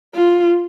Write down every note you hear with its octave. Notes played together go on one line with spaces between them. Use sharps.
F4